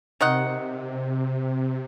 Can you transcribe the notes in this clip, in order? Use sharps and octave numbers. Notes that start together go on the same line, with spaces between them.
C3 D#3 D#5 F#5